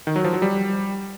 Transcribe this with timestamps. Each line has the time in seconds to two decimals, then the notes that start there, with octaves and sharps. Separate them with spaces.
0.07 D#3
0.16 F#3
0.24 F3
0.33 F#3
0.42 G3